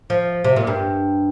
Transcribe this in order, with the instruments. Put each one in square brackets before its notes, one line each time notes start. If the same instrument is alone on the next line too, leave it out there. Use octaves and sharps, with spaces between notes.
[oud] F3
C3
A#2
G2